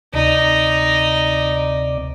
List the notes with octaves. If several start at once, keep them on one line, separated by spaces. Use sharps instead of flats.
D2 C3 D#4 D5